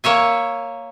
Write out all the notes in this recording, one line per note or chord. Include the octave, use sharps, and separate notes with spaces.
A#3 C#5 E5 G#5